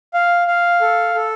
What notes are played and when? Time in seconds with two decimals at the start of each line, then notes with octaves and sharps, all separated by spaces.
0.14 F5
0.47 F5
0.81 A4
1.15 A4